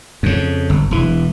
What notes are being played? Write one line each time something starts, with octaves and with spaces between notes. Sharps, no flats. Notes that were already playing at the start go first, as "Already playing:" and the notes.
F2 C#3
G1
E1 E3